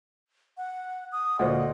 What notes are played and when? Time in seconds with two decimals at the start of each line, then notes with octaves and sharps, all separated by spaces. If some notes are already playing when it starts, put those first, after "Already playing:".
0.57 F#5
1.12 D#6
1.39 D2 A#2 C5 D#5 F#5